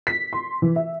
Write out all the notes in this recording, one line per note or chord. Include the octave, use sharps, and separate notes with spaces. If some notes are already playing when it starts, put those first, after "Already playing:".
B6
C6
E3
E5